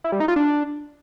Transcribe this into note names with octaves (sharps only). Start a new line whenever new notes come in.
E4
G3
D#4
F4
D4